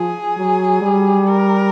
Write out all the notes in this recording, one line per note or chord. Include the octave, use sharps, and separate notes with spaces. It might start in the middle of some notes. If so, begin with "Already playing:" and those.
Already playing: F3 G#4
F#3
G3
A#4